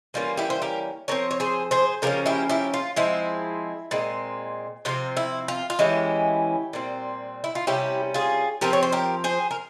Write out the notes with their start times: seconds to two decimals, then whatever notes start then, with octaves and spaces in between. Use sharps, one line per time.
0.14 E3 G3 A#3 C#4 F4
0.37 E4 G4
0.50 C5
0.62 G4 A#4
1.08 F3 C4 A#4 C#5
1.31 C#5
1.40 G#4 C5
1.71 G#4 C5
2.02 C#3 F3 A#3 C#4 G4 A#4
2.26 E4 G4
2.49 E4 G4
2.74 F4
2.96 F3 G#3 C4 E4
3.91 A#2 G#3 C4
4.85 C3 F3 C4 F4
5.17 E4
5.48 F4
5.70 F4
5.79 E3 G#3 C#4 E4 G4
6.73 A#2 G3 C4
7.44 E4
7.55 F4
7.67 C3 G3 C#4 E4 G4
8.14 F4 G#4
8.61 F3 C4 G4 A#4
8.73 C#5
8.83 C5
8.92 G4 A#4
9.24 G#4 C5
9.51 A#4